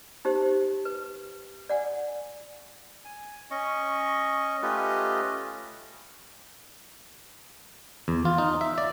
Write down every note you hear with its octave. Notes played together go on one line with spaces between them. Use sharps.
D#4 G4 C5
B4
D5 F#5 G#5
G#5
C#4 D#5 C#6
A3 C#4 F4 G4 B4 D#5
E2
F4
D#4
E5
D5